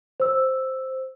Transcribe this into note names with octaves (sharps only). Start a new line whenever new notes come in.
C5 E6